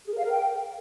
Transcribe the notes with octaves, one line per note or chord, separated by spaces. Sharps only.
G#4
A#4
F5
A#4
G5